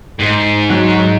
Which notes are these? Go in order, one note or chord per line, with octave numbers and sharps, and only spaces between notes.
G#2
F#3